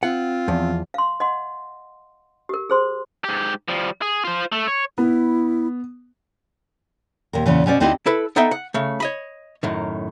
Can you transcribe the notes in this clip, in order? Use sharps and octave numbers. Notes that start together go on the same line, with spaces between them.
C4 F4 F#5
E2 F3
F5 C6
D#5 F#5 C6
G4 A#4
G#4 C5 C6
G#2 G4
F3 G3
G#4
F4 C5
A3
C#5
B3 E4
D#2 A#2 A#4
E2 A#2 C#3 E3
B2 C#4 C5 D5
D2 C4 D#4 E4 G4 D#5
E4 A4 B4
B3 D#4 A4 D#5 E5 G5
F#5
C#3 A3
C#5 D#5 B5
F#2 A2 D#3